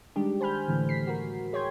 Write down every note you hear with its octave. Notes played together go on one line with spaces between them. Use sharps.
D#3 G3 G#3 D4 G4
C5 G#5 B5 F6 G6
A2 D3 E3 A3
B6 C7
F#4 A#4
G#4 C#5 G5 C6 G#6